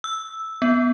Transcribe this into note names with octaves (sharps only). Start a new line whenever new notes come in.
E6
B3